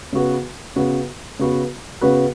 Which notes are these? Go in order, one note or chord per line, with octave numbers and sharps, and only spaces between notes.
C#3 B3 F#4 B4
C#3 B3 F#4 B4
C#3 B3 F#4 B4
C#3 B3 F#4 B4